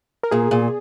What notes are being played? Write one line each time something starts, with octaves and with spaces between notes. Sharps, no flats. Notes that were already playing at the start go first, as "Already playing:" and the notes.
A#4
A#2 G#4
A#2